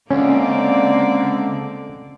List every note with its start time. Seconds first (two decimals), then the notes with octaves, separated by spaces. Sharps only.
0.11 C#2 D3 A#3 C4 C#4 D5